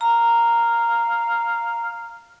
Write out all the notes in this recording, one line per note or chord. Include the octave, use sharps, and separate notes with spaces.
F5 A#5